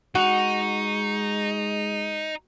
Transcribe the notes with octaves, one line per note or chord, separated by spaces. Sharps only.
G#3 D#4 F#4